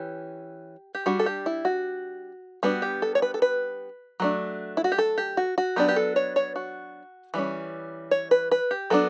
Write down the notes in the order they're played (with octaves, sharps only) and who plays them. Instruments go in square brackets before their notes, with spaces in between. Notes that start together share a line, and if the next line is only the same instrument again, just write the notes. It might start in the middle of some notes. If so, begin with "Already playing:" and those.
Already playing: [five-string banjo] E3 C#4 G4
G4
G3 D4 F#4
A4
G4
E4
F#4
G3 B3 D4 F#4
G4
A4
C#5
B4
A4
B4
F#3 A3 D4
E4
F#4
G4
A4
G4
F#4
F#4
F#3 B3 D4 G4
G4
A4
C#5
C#5
F#4
E3 G3 C#4
C#5
B4
B4
G4
F#3 B3 D4 A4